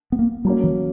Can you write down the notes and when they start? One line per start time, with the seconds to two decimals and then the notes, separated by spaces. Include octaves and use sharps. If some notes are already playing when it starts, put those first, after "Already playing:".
0.12 B3
0.19 A#3
0.45 F#3 G3 A#3 C#4
0.64 E3